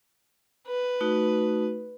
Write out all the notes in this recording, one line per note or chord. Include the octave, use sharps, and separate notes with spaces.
B4
A3 D#4 F#4